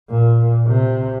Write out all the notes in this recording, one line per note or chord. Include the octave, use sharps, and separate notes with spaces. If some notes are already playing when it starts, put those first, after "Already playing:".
A#2
C3